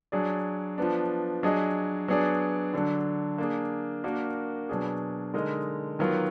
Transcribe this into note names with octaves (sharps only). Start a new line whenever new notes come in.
F#3 D4 G#4 D5
F3 B3 D4
F#3 D4 G#4 D#5
F#3 B3 D4 G#4 D5
D3 F#3 D4
A#3 D4 G#4
A#3 D4 F#4 A#4
B2 F#3 D4 G#4
D3 G#3 D#4 A#4 D#5
D#3 F#3 B3 F4 A#4